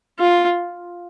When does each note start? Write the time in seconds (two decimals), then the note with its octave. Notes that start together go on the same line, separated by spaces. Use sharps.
0.19 F4